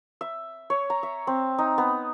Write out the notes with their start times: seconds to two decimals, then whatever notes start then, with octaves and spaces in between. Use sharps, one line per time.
0.21 E5
0.70 C#5
0.90 A#5
1.03 E5
1.27 C4
1.58 D#4
1.78 B3